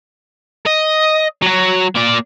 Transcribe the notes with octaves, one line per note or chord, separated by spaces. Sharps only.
D#5
F#3 F#4
A#3 D5